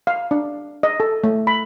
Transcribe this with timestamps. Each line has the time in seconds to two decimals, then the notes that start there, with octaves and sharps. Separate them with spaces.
0.07 F5
0.31 D4
0.83 D#5
1.00 A4
1.24 A3
1.47 B5